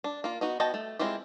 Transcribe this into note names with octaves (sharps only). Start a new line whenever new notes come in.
D4
A#3 F4
B3 D#4 F#4
B3 F#4 D#5 G5 A5
A3
G#3 C4 E4 F4 G4